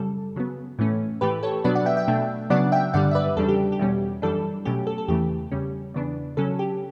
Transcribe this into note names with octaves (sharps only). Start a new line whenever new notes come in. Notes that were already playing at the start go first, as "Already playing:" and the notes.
Already playing: F#2 C#3 G3 A4
C#3 F#3 B3
A2 E3 A3 C#4
A2 E3 A3 G4 B4
A4 C#5
B2 F#3 B3 D4 B4 D5
D5 F#5
E5 G5
E5 G5
B2 A3 D4
C#3 F#3 B3 D4 D5 F#5
E5 G5
G2 D3 G3 D5 F#5
E5
B4 D5
E2 C#3 G3 D4 A4
G4
G4
E2 B2 G3 C#4
F#2 E3 G3 D4 A4
B2 F#3 A3 C#4 G4
A4
A4
E2 C#3 E3 A3 G4
E2 C#3 G3 C#4
E2 C#3 E3 B3 D4
C#3 F#3 C#4 A4
G4